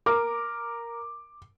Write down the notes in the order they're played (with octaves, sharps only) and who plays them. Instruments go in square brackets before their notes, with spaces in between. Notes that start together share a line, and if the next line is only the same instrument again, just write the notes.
[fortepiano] A#4 [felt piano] D6